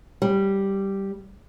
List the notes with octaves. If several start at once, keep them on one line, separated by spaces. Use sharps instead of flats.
G3